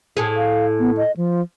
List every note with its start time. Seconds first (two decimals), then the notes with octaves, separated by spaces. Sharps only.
0.17 A2 G#4
0.37 F5
0.79 B3
0.97 D#5
1.17 F3